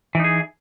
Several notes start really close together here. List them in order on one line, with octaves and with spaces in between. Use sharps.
E3 D#4 G#4